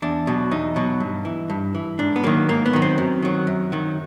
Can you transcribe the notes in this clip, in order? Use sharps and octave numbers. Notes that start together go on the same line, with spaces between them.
E2 D4
B2 F#3
E2 D#4
B2 F#3
G2
E3
G2
E3
G#2 D4
B3
D#3 F#3 A#3
G#2 A#3
B3
D#3 F#3
C4
F#2
D#3 F#3
F#2
D#3 F#3